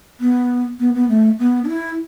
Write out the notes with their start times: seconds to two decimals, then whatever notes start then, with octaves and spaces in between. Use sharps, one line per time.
0.20 B3
0.79 B3
0.95 B3
1.09 A3
1.39 B3
1.64 D4
1.69 E4